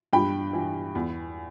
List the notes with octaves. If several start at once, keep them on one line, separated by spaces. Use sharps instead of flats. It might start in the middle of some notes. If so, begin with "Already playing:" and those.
G2 G5 B5
E3
E2